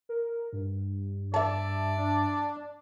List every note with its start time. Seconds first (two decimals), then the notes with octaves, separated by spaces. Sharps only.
0.09 A#4
0.53 G2
1.34 D5 E5 A5
1.97 D4